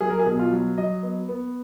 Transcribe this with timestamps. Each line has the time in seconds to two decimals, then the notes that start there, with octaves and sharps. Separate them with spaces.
0.01 F#3 G#4
0.10 A#4
0.19 G#4
0.26 B2
0.39 F4
0.53 F#3
0.78 F#3 D#5
1.03 B3
1.29 B3